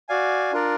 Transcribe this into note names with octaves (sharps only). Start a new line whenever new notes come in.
F#4 D5 F5 G#5
D4 F4 A#4 D5